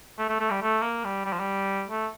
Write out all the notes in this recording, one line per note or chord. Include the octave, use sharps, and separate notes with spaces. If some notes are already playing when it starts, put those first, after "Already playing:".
A3
A3
A3
G3
A3
A#3
G3
G3
F3
G3
A3